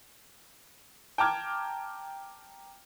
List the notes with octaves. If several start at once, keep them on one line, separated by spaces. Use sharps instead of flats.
G5 A5 A#5 D6 F6 G#6